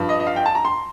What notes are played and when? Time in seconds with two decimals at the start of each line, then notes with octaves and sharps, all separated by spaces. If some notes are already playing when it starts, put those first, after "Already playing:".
Already playing: G2 F3
0.09 D#5
0.20 D#5
0.27 F5
0.36 G5
0.46 A5
0.55 A#5
0.65 C6